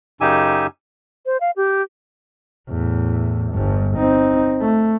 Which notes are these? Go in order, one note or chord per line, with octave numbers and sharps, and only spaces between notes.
F#2 C#3 D#4 G4 G#5 E6
C5
F5
G4
E2 A2
G1 G2
C4 D#4
A3